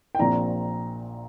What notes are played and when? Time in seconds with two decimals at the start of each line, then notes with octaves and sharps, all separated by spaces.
0.15 G5
0.19 A#1 A#2 F3 C4 A#5